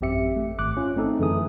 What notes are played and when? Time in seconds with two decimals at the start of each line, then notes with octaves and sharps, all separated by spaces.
0.01 A1 F#2 C4 G4 E5 C#7
0.36 A3
0.58 G#1 D6 F#6
0.77 C#4 F4
0.96 A3 C4 D#4 A4
1.20 F#2 D3 E3 A3 G#4 D#6